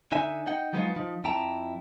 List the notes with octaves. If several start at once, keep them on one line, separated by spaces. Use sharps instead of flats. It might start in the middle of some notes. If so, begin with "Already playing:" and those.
D3 D#4 E5 G#5
D#4 F#5 G5
F3 F#3 G#3 B3 D#4 F4
F3 D#4
F2 E4 G5 A5 A#5